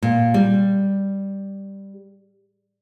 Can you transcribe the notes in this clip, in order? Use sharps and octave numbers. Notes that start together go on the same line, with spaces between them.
A#2
G3